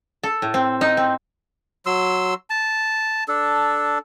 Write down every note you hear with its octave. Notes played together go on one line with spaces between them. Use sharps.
A4
A2
C4
D#4
C4
F#3 C6 E6
A5
D4 A4